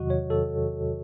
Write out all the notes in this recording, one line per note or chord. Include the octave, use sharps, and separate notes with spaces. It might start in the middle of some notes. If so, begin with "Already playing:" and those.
Already playing: E2 C3 D#3 F#3 F#4 D#5
C#5
A4